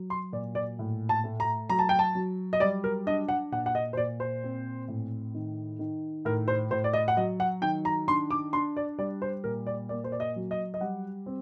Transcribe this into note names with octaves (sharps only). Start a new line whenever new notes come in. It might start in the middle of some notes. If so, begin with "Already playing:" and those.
Already playing: F#3
C6
A#2 D5
D5
A2
A5
A3
A#5
F#3 A#5
A5
G5
A5
F#3
D#5
G3 D5
A#4
D4 D#5
F#5
A#2 F#5
F#5
D#5
C5
A#2 D5
C5
C4
A2
D#3
D#3
A2 A#4
C5
A2 C5
D5
D#5
F#5
F#3 D#5
F#5
D#3 G5
A#5
D4 C6
D6
D4 C6
D5
G3 D5
C5
A#2 A#4
D5
A#3 D5
C5
D5
D#5
F#3
D#5
D#5
G3 F#5
C4